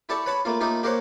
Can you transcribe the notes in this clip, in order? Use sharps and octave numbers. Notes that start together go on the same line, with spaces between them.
E4 G4 A4 D5 A5 C#6
B4 C#5 F#5 A5 B5
A3 A#3 F4
A3 A#3 D#4 F4 G4
A#3 G4 A#4 C5 C#5 F#5